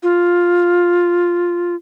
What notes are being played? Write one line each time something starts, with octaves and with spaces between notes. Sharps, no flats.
F4